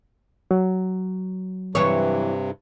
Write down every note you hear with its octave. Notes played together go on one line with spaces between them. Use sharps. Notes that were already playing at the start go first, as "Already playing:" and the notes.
F#3
G2 C3 E3 C#5